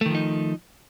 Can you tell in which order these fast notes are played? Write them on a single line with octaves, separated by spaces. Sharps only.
A3 D#3 F3 D#4